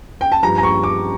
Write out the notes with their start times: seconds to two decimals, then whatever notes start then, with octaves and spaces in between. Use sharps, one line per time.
0.21 G5
0.32 A5
0.43 G2 F3 A#5
0.58 A#5
0.63 C#6
0.84 D6